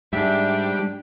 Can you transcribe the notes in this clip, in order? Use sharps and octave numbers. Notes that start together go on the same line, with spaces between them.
G#2 G3 D4 E5